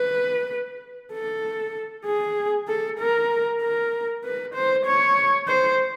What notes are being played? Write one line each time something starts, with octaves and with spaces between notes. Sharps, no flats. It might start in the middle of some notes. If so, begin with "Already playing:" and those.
Already playing: B4
A4
G#4
A4
A#4
A#4
B4
C5
C#5
C5